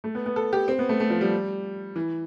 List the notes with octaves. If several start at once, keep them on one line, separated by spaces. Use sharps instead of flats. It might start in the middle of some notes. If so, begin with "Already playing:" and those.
A3
B3
B3
A4
G4
C4
B3
A3
A3
F3
G3
E3